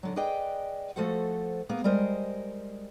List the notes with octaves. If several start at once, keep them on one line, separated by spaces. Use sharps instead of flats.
D3 F#3
G#4 B4 D5 D#5 G5
F3 A3 F#4 A4 C5 F#5
A#3 B3 G#4
G3 G#3 A#4 C5 D#5